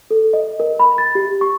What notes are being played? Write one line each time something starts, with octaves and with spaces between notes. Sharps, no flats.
A4
D#5
A#4
B5
A6
G4
C#6